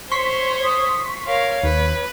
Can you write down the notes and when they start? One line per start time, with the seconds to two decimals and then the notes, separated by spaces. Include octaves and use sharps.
0.11 C5 C#5 C6 C#6 B6
0.64 D#6
1.27 A#4 C#5 F5
1.63 D#2 B4